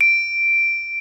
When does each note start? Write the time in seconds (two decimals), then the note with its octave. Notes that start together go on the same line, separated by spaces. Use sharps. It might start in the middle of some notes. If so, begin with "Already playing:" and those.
0.01 D7